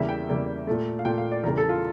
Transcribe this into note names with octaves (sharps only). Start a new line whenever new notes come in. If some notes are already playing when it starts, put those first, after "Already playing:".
Already playing: E2 C#3 G3 A#3 E5
G5
E2 C#3 G3 A#3
A#2 A3
F5
A#2 A3 G5
F5
D5
E2 C#3 G3 A#4
A4
F4